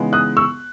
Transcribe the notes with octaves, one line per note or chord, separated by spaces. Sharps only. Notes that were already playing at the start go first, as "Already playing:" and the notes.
Already playing: C#3 E3 G#3 B3 D#4
D#6 F#6
C#6 E6